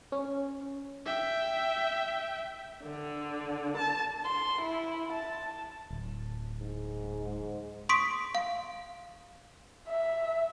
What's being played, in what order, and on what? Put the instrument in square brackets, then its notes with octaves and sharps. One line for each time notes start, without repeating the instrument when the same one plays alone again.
[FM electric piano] C#4
[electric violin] E5 G5
[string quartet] D3
A5
[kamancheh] C6
E4
A5
[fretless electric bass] D1
[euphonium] G#2
[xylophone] C6 C#6 D#6 B6 D7
F5
[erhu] E5